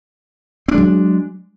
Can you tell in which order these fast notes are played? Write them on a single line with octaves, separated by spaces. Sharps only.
C4 D4 G#3 F#3